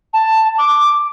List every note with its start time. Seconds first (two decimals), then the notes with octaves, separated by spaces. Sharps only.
0.13 A5
0.58 D6